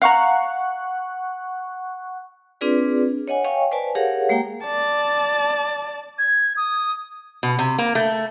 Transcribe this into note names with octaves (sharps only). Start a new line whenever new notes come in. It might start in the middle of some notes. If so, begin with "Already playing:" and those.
F5 F#5 A#5 C#6 F#6
C4 D4 F4 G#4 B4 D5
C#5 D#5 F#5 G#5
C#5 D#5 F5 G5 G#5 C#6
B4 C5 D5 G#5 A5
G4 G#4 A#4 C#5 F5 F#5
G#3 A#3 G4 G5 A#5
D5 A5
G#6
D#6
B2
C3
A#3
A3